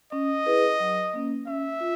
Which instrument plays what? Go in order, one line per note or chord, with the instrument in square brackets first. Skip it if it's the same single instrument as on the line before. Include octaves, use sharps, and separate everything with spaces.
[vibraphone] C#4 [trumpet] D#5
[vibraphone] E4 G#4 B4
F#3
A#3 C#4
[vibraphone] C#4 [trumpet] E5
[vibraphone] F4